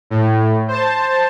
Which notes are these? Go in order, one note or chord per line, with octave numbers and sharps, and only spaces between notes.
A2
C5 A5